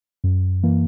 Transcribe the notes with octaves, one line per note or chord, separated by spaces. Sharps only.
F#2
E3 A#3